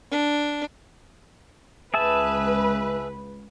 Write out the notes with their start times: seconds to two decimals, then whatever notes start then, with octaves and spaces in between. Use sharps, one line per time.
0.11 D4
1.94 C#2 G#4 B4 E5 A5